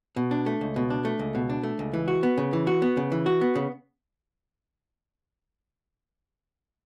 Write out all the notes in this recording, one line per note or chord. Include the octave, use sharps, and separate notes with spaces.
B2
D4
A3
C#2
B2
D4
A3
C#2
B2
D4
A3
C#2
E3
F#4
B3
C#3
E3
F#4
B3
C#3
E3
F#4
B3
C#3